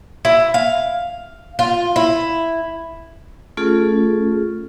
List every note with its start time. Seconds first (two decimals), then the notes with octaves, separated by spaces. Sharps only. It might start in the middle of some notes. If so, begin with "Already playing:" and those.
0.25 E4
0.54 F5
1.59 F4
1.96 E4
3.57 A3 C#4 F4 G#4 A4